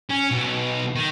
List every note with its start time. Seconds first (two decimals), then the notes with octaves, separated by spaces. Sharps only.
0.10 C#4
0.31 B1
0.96 D#3